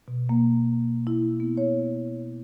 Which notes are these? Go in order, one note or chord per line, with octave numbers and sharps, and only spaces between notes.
B2
A#3
E4
B3
C#5